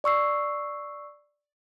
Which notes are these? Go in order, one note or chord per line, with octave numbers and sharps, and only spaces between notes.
D5 C#6 E6 C7